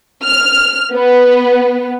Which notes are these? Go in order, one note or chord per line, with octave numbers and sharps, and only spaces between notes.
F6
B3